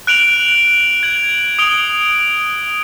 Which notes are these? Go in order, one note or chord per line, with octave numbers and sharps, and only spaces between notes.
F#6 D7 F7 F#7
G#6 F#7
D#6 D7 F7 G7